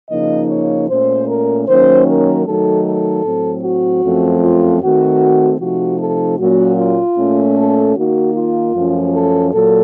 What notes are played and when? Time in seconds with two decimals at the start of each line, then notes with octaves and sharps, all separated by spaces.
0.10 C#3 F3 A#3 D#4 D#5
0.50 C#5
0.89 A#2 A3 C#4 C5
1.28 A#4
1.67 D#3 F#3 A#3 C#4 C5
2.07 A#4
2.46 D#3 F#3 A3 D#4 A4
2.85 A4
3.24 A2 F#3 C4
3.64 F#4
4.03 F#2 F3 A3 C4
4.42 F4
4.81 D#3 A3 C4 F#4
5.60 C3 F3 A3 D#4 F#4
6.00 A4
6.39 A#2 F#3 A#3 C#4 F#4
6.78 F4
7.17 A#2 A3 C#4
7.57 A4
7.96 D#3 A#3 D#4 F#4
8.35 F4
8.74 F#2 F3 A3 C#4
9.14 A4
9.52 A#2 F#3 A4